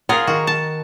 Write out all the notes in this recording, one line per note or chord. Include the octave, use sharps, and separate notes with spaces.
F4 G#4 A#4 F#5
D#3 F#4
A5